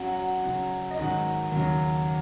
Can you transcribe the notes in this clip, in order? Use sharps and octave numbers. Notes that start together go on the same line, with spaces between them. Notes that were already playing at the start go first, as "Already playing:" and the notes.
Already playing: F#2 F#3 F#4 F#5
F#4 F#5
F#2 C#3 F#3
D#5
G#2 D#3 F#3 F#4 F#5
D#2 C#3 F#3